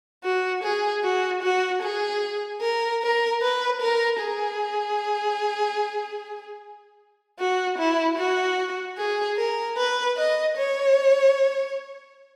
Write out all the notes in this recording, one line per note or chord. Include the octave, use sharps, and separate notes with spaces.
F#4
G#4
F#4
F#4
G#4
A#4
A#4
B4
A#4
G#4
F#4
E4
F#4
G#4
A#4
B4
D#5
C#5